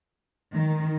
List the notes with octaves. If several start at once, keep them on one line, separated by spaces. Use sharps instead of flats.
D#3